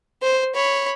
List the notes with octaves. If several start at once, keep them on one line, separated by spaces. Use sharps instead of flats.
C5
C#5 B5